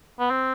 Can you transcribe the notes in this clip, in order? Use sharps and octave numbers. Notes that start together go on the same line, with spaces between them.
B3
C4